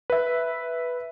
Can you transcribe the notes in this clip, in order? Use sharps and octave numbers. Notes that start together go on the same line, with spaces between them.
B4 E5